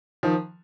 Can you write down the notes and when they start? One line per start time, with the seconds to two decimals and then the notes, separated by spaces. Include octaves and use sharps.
0.23 D#3 F3